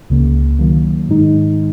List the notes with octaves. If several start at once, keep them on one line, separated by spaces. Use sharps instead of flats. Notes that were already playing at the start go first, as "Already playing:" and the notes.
C#2 C#3 A#3
D#3 F#3 A#3
G#2 D#3 G#3 D#4